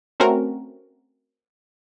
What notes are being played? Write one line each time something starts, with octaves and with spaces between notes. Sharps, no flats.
A3 C4 C#4 F#4 A#4